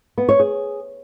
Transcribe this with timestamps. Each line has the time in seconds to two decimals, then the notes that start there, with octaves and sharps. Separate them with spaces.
0.18 B3
0.29 C#5
0.40 G#4